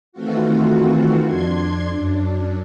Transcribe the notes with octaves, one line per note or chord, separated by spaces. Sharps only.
D#3 E3 A3 C4 F4 F#4
F2 D4 C6 G#6
F#2 D4